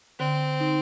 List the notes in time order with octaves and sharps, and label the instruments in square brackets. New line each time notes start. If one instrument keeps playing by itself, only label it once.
[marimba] D3 [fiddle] C4
[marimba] D#4